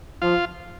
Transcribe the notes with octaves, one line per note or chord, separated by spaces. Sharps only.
F3 F4